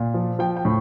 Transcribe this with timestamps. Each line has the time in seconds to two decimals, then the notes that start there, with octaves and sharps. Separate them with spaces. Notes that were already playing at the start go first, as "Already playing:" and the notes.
Already playing: A#2
0.14 F3
0.39 F3 G5
0.57 G5
0.65 A2